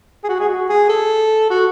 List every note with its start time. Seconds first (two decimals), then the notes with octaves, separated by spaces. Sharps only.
0.24 G#4
0.29 F#4
0.40 G#4
0.49 F#4
0.69 G#4
0.89 A4
1.50 F#4